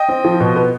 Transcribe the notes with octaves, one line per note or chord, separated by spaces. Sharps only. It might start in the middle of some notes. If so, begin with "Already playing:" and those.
Already playing: D#5 G5
C4
F3
B2
B3